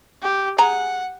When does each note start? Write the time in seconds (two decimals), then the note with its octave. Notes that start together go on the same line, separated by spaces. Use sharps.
0.22 G4
0.58 G#4 F#5 G#5 A#5